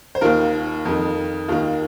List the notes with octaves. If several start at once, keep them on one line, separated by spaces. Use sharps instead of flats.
C5
D#2 D#3 F4 A#4
F2 D#3
D#2 D#3 F4